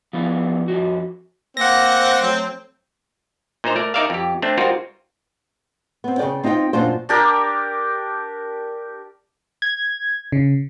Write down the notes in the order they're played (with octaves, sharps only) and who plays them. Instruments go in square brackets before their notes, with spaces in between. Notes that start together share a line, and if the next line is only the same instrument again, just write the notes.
[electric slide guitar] F3 B3 E4
F2 D#3 F#4
[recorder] A#3 [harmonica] C4 [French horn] C5 [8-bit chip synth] F#5 A#6
[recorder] F#3 [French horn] A3
[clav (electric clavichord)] A#2 D#4 C5 A#5
A3 A#4 D5
D#4 A#4 D5 E5 F5
F2 G4
A3 C4 D4
G3 G#3 C4 F4 F#4 A#4
[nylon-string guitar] B3 C4
C#3 G#4 B4 D5 G5
C4 D#4 F4 F5 G5
F#2 A#2 D4 F4 C5
[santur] D4 G4 A#4
[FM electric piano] G#6
C#3